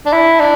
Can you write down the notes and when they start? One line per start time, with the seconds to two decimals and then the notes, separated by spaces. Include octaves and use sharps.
0.06 D4
0.13 E4
0.40 D4